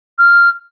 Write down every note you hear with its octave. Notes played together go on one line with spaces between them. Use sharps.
F6